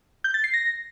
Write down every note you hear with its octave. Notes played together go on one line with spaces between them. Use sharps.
G6
A6
C7
A#6